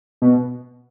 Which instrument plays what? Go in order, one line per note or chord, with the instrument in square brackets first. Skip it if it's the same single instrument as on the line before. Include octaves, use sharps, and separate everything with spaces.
[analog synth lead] B2